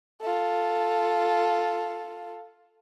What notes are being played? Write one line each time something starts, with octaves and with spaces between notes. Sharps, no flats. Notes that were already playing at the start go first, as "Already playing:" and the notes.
F4 A4